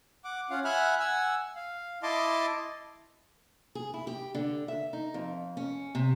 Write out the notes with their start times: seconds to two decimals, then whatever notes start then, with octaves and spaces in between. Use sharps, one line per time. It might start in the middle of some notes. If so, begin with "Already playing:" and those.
0.24 F#5 D6
0.50 C#4 F4 F5 F#5
0.64 E5 F#5 G#5 B5 F6 F#6
1.00 F#5 G#5 E6
1.56 F5
2.03 E4 D#5 A5 C6 D6
3.75 G#4
3.94 E4
4.07 G4
4.35 D3
4.68 E5
4.93 D#4
5.14 F2
5.57 C#4
5.95 C3